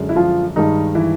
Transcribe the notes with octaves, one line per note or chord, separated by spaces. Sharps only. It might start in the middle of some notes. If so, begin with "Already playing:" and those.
Already playing: F#2 D3 G#3
E4
F3 F4
G2 D#3 G#3 D#4
E3 E4